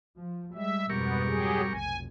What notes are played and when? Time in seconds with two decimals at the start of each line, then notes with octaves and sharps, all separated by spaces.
0.17 F3
0.54 G3 G#3 E5
0.90 F2 G#2 B2 G3 B3 A#4 C#6
1.27 F#3 G4 G#4
1.72 F1 B1 G#5